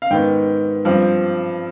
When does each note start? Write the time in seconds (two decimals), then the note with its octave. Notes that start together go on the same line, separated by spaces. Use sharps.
0.02 F5
0.10 G#2 D#3 B3 G5
0.85 G2 F3 C4